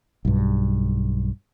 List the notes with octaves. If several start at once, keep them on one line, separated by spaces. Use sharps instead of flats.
B1 G2